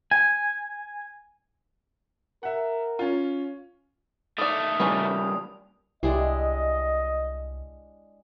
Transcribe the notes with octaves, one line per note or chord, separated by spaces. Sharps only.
G#5
A#4 E5 F#5
C#4 F4
D#3 A3 E4 D5 D#6
E3 G3 A#3 C#4 D4 B4
C2 G#3 D4 E4 G4 G#4 D#5